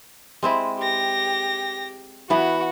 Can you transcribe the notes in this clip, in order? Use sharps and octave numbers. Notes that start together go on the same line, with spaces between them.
G#3 C4 E4
G4 A#6
E3 B3 F#4